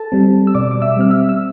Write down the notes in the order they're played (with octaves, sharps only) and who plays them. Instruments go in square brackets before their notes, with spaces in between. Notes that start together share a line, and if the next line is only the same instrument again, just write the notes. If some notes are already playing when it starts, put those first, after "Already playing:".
Already playing: [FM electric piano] A4 A5
G3 C4
E6
B2 D5 D6
D6
E5 E6
G3 C4 F6
E5 E6
E6